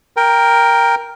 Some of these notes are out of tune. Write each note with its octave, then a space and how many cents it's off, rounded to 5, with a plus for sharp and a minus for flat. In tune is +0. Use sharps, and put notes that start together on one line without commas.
A#4 +0 G5 +10